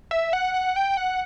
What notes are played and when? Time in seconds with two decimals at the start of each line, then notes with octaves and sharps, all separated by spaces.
0.11 E5
0.33 F#5
0.54 F#5
0.76 G5
0.97 F#5